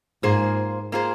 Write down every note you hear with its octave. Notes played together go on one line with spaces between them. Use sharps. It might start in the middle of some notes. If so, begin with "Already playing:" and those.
G#2 A#3 F4 G#4 C5
A#3 F4 G#4 C5